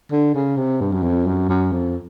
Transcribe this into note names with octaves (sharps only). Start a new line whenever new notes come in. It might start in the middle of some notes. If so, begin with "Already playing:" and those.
D3
C#3
C3
G2
F#2
F2
F#2
F#2
F2